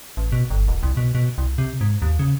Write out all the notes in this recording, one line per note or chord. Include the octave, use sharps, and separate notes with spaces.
A1
B2
G1
D#1
C2
B2
B2
C2
C3
G#2
D#2
C#3